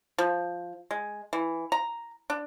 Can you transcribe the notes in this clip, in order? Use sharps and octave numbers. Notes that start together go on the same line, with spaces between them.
F3
G#3
E3
A#5
D4